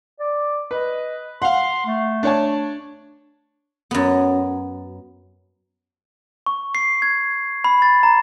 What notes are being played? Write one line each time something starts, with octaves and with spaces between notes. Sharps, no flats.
D5
B4 D#5
F5 F#5 C6
A3
D4 C#5 A5
F#2 B3
C#6
C7
G#6
B5
A6
A#5